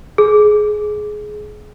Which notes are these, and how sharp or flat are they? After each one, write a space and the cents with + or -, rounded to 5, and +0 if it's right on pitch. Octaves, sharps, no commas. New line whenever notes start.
G#4 +20